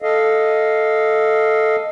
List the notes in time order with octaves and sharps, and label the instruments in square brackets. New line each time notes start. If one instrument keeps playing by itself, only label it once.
[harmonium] A4 D#5 F5